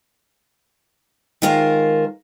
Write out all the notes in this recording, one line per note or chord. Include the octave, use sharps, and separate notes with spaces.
D#3 G#3 F4 A#4 C5